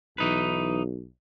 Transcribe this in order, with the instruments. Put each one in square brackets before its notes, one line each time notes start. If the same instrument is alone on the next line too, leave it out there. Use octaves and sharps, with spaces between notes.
[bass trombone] B1 [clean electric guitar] E3 D#4 B4